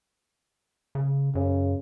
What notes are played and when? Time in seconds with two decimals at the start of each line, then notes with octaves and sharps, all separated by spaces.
0.95 C#3
1.35 F#2 C#3